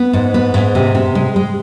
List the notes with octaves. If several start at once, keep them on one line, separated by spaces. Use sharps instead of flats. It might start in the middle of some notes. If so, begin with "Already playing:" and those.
Already playing: B3
G#2
B3
G#2
C3
C3
G#3
G#3